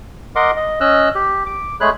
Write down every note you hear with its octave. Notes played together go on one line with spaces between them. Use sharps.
A#4 D#5 F#5 C6 D6
D#5
C#4 D#5 E6 F#6
G4
D6
G#3 A3 G#4 C#5 B5 F#6